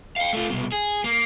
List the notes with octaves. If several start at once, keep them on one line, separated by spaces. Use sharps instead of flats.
F5 G5
A3 F4
C2 B2
G#4
A#3